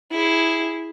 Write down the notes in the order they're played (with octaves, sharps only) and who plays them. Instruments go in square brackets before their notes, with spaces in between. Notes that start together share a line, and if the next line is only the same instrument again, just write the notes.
[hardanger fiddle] E4 G#4